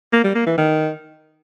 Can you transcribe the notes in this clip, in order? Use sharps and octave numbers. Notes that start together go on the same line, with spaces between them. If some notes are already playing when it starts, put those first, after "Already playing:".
A#3
G3
A#3
E3
D#3